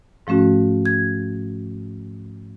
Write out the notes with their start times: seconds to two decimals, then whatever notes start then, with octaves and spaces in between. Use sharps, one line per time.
0.27 G#2 F3 A3 C#4 F#4
0.86 G#6